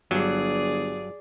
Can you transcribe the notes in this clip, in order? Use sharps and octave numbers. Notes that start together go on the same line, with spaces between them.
G1 G2 F#3 G#4 D5